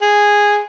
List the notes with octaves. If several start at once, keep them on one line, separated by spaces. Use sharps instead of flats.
G#4